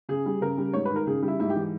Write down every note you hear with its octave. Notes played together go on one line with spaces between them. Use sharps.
C#3 G#4
G3
C#3 A#4
G3
G#2 C#5
D#3 B4
A#4
C#3 G#4
G3
E4
G#2 E4
G4
E3